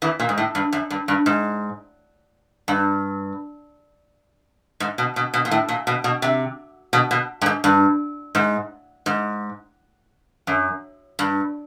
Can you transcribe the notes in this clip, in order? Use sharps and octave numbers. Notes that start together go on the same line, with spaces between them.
E2 E3
A#2
G#2
A2
G2
F#2
G2
G2
G#2
G2
G#2
B2
B2
B2
A#2
A2
A#2
B2
B2
C3
B2
B2
G2
G#2
G2
G#2
G#2
F#2
G2